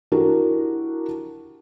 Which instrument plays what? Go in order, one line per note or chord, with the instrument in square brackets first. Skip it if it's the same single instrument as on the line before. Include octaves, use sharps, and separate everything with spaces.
[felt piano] D4 E4 F#4 G4 A#4